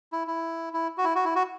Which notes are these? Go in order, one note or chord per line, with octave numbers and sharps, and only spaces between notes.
E4
E4
E4
F#4
E4
F#4
E4
F#4